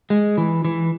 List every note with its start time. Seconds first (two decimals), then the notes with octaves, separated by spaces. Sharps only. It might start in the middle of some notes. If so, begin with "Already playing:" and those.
0.10 G#3
0.38 E3
0.65 E3